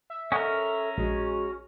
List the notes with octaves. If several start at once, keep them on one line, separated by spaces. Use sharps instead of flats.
E5
C#4 A4 A#4 D#5 F#5 G#5
A#1 G#3 F#4